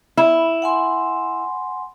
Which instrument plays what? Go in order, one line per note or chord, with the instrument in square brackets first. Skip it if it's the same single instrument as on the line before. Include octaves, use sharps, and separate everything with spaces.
[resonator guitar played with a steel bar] E4
[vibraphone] F#5 G#5 C6